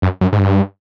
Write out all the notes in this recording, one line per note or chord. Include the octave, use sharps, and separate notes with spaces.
F#2
F#2
G#2
G2